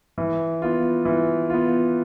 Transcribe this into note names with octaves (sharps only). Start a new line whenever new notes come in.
E3
B3 F4
E3
B3 F4